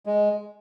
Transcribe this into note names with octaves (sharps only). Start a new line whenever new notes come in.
G#3